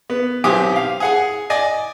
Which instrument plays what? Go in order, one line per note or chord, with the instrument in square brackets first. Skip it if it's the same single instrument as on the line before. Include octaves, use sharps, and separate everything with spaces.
[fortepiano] B3
B1 C4 G4 G#5 D6 D#6
F5
G#4 F#5 G#5
D5 D#5 G#5